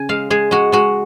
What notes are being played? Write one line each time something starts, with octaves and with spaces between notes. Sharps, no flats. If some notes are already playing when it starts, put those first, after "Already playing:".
Already playing: C#3 G#5
G#3 F5
G#3 G#4
G#3 F#4
G#3 F#4